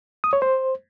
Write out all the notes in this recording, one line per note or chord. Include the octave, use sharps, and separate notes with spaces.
D#6
C#5
C5